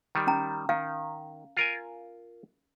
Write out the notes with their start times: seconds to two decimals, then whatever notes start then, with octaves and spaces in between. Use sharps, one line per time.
0.15 D#3 G3
0.27 C#4 A#5
0.69 D#3 F5
1.57 F4 A#4 G#5